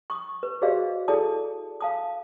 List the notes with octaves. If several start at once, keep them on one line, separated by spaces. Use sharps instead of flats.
C#6 D#6
B4
F#4 G#4 C5 D5 D#5 F5
E4 G#4 A4 D5 A5 D#6
F5 A5 D#6